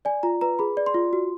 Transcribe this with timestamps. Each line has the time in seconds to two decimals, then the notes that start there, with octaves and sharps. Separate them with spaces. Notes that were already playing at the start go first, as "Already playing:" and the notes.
0.05 D5 G#5
0.23 F4 A#5
0.41 B4 A#5
0.59 G#4 B5
0.77 D5
0.86 C6
0.94 F4
1.13 F#4